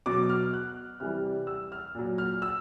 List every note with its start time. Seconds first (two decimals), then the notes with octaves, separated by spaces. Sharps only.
0.06 B2 F#3 D6
0.29 F6
0.53 F#6
1.00 C3 E3 G3 F6
1.47 E6
1.72 F6
1.95 A#2 F#3
2.18 F6
2.42 E6